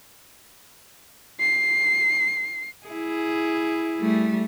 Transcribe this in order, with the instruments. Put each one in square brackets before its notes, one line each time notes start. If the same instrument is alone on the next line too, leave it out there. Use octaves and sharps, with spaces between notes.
[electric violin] C7
[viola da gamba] E4 G#4
[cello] G3 A3